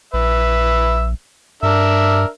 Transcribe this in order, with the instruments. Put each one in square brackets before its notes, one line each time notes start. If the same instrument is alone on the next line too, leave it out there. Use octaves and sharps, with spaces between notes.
[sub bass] A#1 [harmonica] B4 E5
[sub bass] G2 [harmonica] D4 A#4 E5